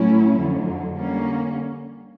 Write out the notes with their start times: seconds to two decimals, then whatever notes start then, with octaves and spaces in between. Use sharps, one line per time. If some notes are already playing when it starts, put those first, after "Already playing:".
Already playing: A2 F#3 A3 C#4 E4
0.38 F2 D3 F#3
0.94 D3 G3 A#3 C#4